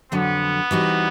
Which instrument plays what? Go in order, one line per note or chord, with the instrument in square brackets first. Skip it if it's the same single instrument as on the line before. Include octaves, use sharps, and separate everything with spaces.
[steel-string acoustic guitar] F2 D3 F#3 [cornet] B3
[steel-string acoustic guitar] E3 G3 C4 D#4 F#4